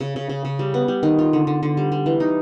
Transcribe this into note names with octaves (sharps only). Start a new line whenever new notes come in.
C#3
C#3
C#3
C#3
G3
B3
G3
D#3
F4
D3
D3
D3
G3
G3
E3
D#4